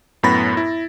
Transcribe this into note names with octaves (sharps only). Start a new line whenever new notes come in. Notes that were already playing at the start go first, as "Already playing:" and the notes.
F#2 A2 B3 B5 A6 A#6
E4